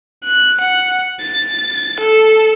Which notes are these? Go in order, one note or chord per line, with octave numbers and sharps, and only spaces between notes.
F#6
F#5
A6
A4